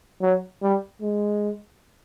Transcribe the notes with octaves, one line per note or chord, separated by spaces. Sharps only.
F#3
G3
G#3